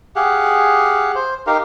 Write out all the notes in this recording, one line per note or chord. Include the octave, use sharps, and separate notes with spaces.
G4 G#4 F5 F#5
C5
D#4 G4 A#4 F5